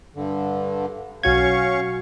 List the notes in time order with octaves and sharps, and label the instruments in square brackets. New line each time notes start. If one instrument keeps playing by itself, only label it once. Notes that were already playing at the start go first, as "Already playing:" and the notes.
[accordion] G2 D3
[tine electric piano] B1 F#4 G#6 [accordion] C#4 F5 C#6